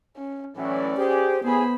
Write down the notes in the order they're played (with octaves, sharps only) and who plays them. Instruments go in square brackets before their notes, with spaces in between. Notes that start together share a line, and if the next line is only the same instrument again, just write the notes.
[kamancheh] C#4
[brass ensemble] A2 E3 F#3 [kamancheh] C#4 D5
[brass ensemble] G4 G#4 [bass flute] C5
[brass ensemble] A2 G#4 [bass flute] B3 [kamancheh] C5 B5